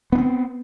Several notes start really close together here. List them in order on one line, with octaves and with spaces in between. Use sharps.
B3 D4 C4